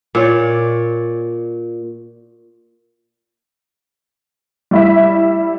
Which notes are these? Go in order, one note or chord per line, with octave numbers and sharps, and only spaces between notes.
A#2 C#5 D5
G3 E4 E5